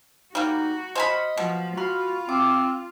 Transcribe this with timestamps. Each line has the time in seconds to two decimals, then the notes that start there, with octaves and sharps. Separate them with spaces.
0.35 G3 A#3 D#4 F#4
0.95 C5 D#5 G#5 B5 F6
1.37 B2 F3
1.77 F4 F#4 B5 C6 F6
2.29 C4 D6